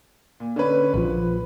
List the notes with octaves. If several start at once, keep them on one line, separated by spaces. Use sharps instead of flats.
A#2
D3 C#4 B4
A#1 F3 B4